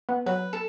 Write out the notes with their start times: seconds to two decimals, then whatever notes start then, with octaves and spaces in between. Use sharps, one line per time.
0.09 B3
0.26 F#3 B4
0.53 A4